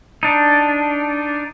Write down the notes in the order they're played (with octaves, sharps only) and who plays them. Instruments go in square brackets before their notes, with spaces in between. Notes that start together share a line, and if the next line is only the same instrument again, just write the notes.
[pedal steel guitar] D4 D#4